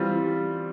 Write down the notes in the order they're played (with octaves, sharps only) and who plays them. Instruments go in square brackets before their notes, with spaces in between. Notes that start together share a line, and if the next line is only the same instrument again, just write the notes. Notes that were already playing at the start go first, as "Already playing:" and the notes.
Already playing: [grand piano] E3 G3 C4 F4